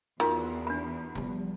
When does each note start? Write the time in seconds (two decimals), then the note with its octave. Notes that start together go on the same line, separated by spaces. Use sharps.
0.20 E2 D#3 F4 F#4
0.67 D4 B5
1.15 F3 G3